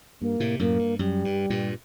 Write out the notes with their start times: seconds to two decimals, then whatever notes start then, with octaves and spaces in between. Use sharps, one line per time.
0.21 G2 A#3
0.40 A2 C3
0.59 F#2 A2 A#3
0.79 G2
0.99 F#2 G3
1.25 G2
1.50 G2 A#2